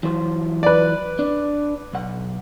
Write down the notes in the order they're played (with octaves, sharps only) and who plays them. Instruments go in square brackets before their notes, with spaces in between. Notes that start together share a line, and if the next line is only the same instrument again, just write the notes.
[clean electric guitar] E3 F#3 C5
[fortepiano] B4 D5
[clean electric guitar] D4
B1 F#5